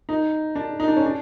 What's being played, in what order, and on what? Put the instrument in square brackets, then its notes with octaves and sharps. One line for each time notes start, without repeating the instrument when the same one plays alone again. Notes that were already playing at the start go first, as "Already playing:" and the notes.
[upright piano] D#4
D4
D#4
D4
C#4
D4